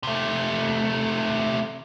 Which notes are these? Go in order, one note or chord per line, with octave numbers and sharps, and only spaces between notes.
C3 A3